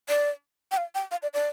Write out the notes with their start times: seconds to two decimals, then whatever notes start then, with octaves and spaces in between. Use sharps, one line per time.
0.09 D5
0.71 G5
0.77 F5
0.95 G5
1.11 F5
1.22 D5
1.34 D5